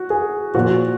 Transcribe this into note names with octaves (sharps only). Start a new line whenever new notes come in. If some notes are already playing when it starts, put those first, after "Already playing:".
Already playing: F#4
G#4
A#2 F3 F#4